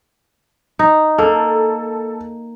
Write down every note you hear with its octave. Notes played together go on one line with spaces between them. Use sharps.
D#4
A#3 A4